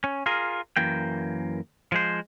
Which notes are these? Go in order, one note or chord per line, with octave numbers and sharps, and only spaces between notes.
C#4
F4 G#4 A#4
F#2 E3 A#3 G5
F3 G#3 C5